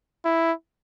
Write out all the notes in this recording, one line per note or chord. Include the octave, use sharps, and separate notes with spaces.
E4